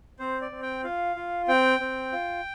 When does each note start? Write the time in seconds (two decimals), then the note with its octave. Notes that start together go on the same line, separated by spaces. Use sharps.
0.19 C4 C5
0.41 D5
0.52 C4
0.62 G5
0.84 F4 F5
1.16 F4
1.48 C4 G5
1.80 C4
2.12 F4